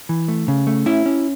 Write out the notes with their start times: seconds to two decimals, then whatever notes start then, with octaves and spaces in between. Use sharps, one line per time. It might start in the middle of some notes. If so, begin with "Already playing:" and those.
0.09 E3
0.28 A3
0.48 C#3
0.67 A3
0.86 C#4 E4
1.06 C#4